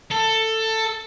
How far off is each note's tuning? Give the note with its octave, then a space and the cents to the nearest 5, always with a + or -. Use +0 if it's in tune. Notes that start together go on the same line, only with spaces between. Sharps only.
A4 +15